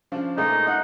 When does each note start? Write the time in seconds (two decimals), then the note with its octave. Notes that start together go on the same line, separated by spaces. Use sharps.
0.12 C#3 F3 D4
0.37 A#2 G#3 A3 D#4
0.67 D#4 F#5